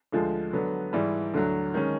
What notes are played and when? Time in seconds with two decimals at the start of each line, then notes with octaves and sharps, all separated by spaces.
0.12 D2 D3 F3 G#3
0.53 D3 F#3 B3
0.93 G#2 E3 G3
1.34 D2 D3 F#3
1.74 D#3 G#3 C#4